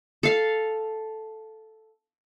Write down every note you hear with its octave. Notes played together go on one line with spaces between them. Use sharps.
A4 F5